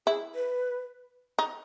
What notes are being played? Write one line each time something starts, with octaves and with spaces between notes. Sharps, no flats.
E4 G#4
B4
D#4